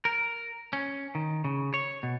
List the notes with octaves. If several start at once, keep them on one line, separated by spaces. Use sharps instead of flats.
A#4
C#4
D#3
C#3
C#5
B2